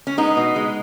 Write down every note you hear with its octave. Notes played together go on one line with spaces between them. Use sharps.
C#4
G#3 B3 D#4
B2
G#3